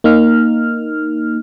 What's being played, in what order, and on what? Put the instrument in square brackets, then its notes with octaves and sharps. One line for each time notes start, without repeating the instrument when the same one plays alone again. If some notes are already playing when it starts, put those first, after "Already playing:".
[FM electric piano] A#3 D#4 F6